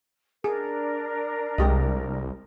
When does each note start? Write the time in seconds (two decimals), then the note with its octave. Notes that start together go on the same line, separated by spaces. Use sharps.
0.44 D4 G#4 A#4
1.58 C2 G#3 G4 D#5